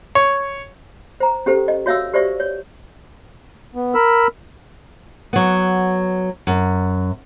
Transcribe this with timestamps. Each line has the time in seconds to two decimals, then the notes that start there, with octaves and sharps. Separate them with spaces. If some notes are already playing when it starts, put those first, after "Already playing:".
0.15 C#5
1.20 C5 A#5
1.46 C#4 G4 A4 C5
1.68 D#5
1.86 F#4 C#5 E5 F5 D#6 E6
2.13 G4 C5 D5 E5 C#6
2.40 C#5
3.75 B3
3.95 A#4 B5 E6
5.33 F#3 B3
6.47 F#2